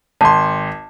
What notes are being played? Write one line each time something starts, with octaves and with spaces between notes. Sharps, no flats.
G#1 A5 C6